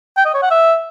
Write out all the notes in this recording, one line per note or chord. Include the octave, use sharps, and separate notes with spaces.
G5
D#5
C#5
F#5
E5